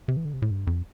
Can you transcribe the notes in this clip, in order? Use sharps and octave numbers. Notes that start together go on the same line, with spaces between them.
C3
E3
D3
C3
A2
G2
F2